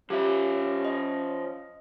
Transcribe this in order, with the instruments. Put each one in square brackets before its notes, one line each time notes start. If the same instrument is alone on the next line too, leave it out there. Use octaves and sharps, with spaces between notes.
[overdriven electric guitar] F3 E5 [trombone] C#4 [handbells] G4
[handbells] D#5